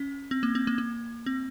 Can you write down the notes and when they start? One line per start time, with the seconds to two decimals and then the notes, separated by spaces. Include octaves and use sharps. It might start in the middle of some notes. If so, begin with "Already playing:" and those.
Already playing: C#4
0.31 C4
0.43 A#3
0.55 C4
0.67 A#3
0.78 A#3
1.26 C4